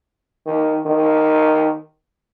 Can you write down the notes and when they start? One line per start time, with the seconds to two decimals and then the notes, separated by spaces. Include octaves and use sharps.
0.46 D#3
0.86 D#3